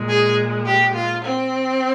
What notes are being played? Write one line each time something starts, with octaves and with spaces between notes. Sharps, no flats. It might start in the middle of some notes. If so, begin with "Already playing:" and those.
Already playing: A#2 G#3
G#4
G4
F4
C4